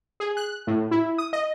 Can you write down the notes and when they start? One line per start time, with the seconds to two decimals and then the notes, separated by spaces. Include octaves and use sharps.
0.20 G#4
0.37 F#6
0.67 A2
0.91 E4
1.18 D#6
1.33 D#5